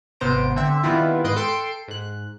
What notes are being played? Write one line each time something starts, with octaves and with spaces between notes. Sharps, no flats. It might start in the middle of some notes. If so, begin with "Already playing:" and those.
G#1 C3 B3 C5 A#5 D7
D3 C4 E5
D#3 G3 B3 C4 E4 F4
G#2 B4 D#5 C6 D7
A4 G5 C6 D7
G#2 F#6